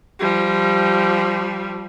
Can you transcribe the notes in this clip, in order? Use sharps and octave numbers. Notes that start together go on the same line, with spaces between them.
F3 G3